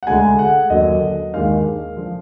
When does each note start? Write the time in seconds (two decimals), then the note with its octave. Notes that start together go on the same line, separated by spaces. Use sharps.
0.03 F#5
0.07 D2 D3 G#3 G#5
0.39 F#5
0.70 D#2 D3 F#3 D#5
1.33 D#2 D#3 G#3 D4 F5
1.96 D3 F3